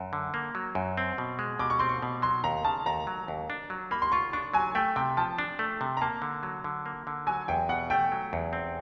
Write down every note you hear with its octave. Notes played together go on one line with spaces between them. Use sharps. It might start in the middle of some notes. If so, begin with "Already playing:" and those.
Already playing: F#2
D3
A#3
F#3
F#2
C4
B2
G#3
B2 D6
C#6
C4 C6
C#6
B2
F#3 C6
D#2 A#5
C#3 A5
D#2 A#5
F#3
D#2
D4
F#3
A#3 B5
C6
F4 C#6
D4 C#6
F#3 G#5
A3 G5
C3 G5
F3 A5
D4
A3
C3
A#5
A#3 A5
D3
F#3
D3
A#3
D3
F#3 G#5
E2 G5
B2 F#5
A3 G5
F#3
E2
C4